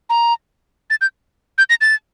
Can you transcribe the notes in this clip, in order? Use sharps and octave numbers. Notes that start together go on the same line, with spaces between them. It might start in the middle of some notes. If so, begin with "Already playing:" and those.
A#5
A6
G6
G6
A#6
A6